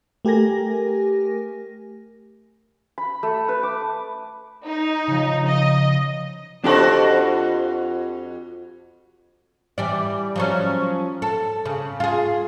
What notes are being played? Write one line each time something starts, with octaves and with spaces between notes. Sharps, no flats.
A3 G4 A#4 G#5 A#6
B5
A3
B4
D6
D#4
C#3 F3
D#5
F2 D4 F#4 G4 A4 C5
E3 G3 D5
F3 F#3 C#4
A4
C#3
F4 G#4